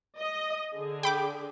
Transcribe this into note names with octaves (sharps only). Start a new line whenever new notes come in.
D#5
D3 G#4
G5 B5 D6